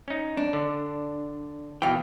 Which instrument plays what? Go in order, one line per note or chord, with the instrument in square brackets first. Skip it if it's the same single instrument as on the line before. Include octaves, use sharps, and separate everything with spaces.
[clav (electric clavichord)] C#4 D#4
[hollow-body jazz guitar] D4
[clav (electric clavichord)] D3
[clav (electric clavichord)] B2 E3 [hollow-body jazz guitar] F5 G5